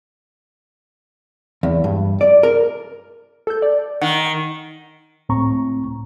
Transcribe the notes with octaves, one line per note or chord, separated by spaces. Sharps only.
E2
G2
D5
A#4
A4 G6
D5
D#3 F#5
C#2 A2 C4 A#5 C#6